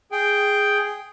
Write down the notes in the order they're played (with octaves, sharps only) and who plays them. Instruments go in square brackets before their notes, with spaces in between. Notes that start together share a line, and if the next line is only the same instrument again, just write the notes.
[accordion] G#4 G5